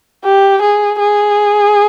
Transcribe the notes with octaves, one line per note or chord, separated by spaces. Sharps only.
G4
G#4
G#4